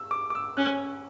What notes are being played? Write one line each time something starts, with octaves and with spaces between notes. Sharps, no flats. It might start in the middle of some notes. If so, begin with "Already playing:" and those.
Already playing: E6
D6
D6
E6
C#4 F#6